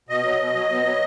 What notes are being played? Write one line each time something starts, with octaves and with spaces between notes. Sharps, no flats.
B2 D#5
F#3
B2
F#3
B2
F#3